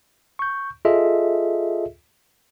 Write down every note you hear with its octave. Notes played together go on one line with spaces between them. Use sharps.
C#6 G6
F4 G#4 A4 D#5 E5